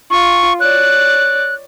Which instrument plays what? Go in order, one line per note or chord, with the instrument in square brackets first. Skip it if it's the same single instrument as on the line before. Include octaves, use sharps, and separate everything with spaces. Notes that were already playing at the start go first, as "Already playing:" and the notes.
[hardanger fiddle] F4 [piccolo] C#6
[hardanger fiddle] C#5 D5 [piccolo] F#6